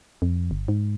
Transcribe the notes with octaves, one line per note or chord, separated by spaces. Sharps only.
F2
G1
G#2